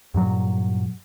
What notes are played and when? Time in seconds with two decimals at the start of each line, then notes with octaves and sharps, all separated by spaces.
0.14 G2 A#2 F#3